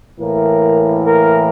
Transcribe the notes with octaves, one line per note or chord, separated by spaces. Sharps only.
A2 E3 A#3 A#4
A#4